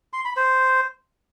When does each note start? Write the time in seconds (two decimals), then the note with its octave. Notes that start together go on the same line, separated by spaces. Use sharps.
0.13 C6
0.25 B5
0.37 C5